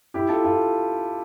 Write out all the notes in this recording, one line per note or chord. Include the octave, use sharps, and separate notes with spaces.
E4 G4
F4 A4
F4 A4